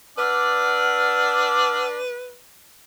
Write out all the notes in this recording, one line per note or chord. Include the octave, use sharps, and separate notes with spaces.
D4 B4 D5 F#5 E6 F6